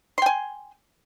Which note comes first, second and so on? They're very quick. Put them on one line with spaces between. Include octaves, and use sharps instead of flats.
C6 G5 G#5